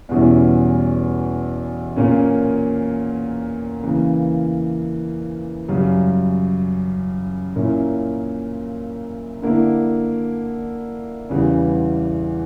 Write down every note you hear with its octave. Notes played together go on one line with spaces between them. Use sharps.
E2 B2 G3 C#4 E4
A#2 A#3 C#4
C#3 E3 A#3
F#2 C#3 G3
A#2 A#3 C#4 E4
D3 A#3 E4
E2 C#3 E3 G3